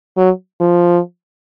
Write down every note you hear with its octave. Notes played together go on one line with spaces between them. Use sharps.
F#3
F3